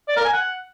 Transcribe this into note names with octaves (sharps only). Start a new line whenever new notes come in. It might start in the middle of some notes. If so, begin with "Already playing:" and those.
D5
A#4
G#5
F#5